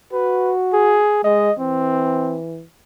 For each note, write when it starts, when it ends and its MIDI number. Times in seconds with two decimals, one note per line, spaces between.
0.13 1.02 66
0.13 0.52 71
0.73 1.20 68
1.24 1.50 56
1.24 1.54 75
1.59 2.64 52
1.59 2.38 60